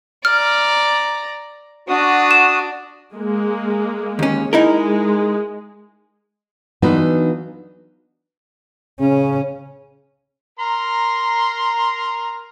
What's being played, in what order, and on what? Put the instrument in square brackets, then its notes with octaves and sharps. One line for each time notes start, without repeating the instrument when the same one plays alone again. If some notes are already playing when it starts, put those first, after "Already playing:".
[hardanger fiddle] D5 A#5 [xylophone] F6
[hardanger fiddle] D4 [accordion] F#4 D#6
[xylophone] E7
[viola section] G#3 A#3
[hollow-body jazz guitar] D#2 C#4
[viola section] G#3 [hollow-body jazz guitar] D#4 E4 A#4
[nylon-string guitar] E3 F#3 B3 D4 D#4 F4
[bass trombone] C#3 [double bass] C#4
[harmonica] A#4 A#5 C6